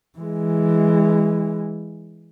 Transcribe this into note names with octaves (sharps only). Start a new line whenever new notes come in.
E3 G#3